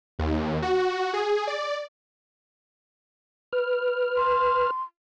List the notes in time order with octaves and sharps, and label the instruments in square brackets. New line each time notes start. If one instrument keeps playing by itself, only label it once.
[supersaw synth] D#2
F#4
G#4
D5
[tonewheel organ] B4 F6
[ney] C6